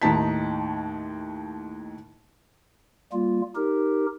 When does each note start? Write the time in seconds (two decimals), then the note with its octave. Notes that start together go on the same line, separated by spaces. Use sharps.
0.02 D#2 A2 D#4 A5 B6
3.12 G3 A#3 F4
3.56 D#4 G4 A#4